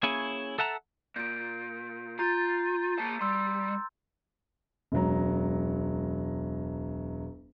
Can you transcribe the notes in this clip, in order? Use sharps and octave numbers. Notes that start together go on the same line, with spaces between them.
A#3 C#4 E4 G#4 C#5 G#5
A4 E5 F#5 A5 A#5
A#2 G6 D7
F4 A#5 G6 A6
A#3 A5
G3 C6 E6
E1 C#2 F#3 A#5